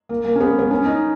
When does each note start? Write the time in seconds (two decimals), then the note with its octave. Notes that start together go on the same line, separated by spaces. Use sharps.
0.09 A#3
0.25 A#3
0.36 C#4
0.41 B3
0.59 B3
0.71 C#4
0.85 D#4